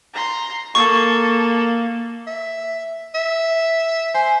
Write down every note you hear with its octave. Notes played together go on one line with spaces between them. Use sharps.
A#5 C6
A#3 A4 C#6
E5
E5
C5 G#5